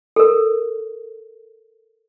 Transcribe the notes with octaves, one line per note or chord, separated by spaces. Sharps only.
A4 A#4